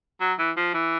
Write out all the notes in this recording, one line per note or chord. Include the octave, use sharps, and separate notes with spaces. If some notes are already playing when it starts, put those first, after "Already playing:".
F#3
E3
F3
E3